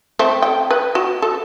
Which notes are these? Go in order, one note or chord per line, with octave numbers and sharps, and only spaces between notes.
A3 C4
G5
B4
F#4
A4